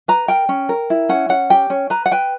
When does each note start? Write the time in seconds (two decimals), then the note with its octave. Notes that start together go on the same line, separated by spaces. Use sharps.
0.08 B4 A#5
0.28 A#4 G5
0.49 C#4
0.69 A#4
0.90 E4
1.09 C#4 F#5
1.29 C#4 F#5
1.50 G4 G5
1.70 C#4
1.90 B4 A#5
2.06 F#5
2.11 B4 G5